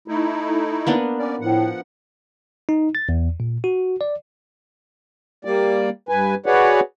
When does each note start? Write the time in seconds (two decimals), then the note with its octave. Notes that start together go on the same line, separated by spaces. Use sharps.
0.08 A3 D#4 E4
0.87 A#3 B3 D4
1.18 C#4 D5
1.41 A2 F3 F#5
2.69 D#4
2.95 A6
3.09 E2
3.40 A#2
3.64 F#4
4.01 D5
5.45 G3 A#3 D5
6.09 G2 B4 G#5
6.46 F#4 G#4 B4 C#5 D5 F#5